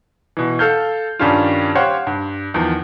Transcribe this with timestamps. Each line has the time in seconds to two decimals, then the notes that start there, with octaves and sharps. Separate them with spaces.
0.37 B2 E3
0.59 A4 F5 A5 F6 G6
1.19 G2 D#3 G3 C#4 D4 F4
1.75 G4 C5 C#5 F5 F#5
2.07 G2
2.54 E2 D#3 F3